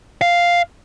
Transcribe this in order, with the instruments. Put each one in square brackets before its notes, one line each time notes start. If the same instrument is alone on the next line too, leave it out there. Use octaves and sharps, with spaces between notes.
[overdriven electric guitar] F5